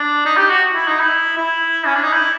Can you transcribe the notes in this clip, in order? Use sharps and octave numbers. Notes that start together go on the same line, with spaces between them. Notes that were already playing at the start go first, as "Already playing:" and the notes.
Already playing: D4
D#4
G4
F#4
E4
D#4
E4
E4
C#4
D4
D#4
E4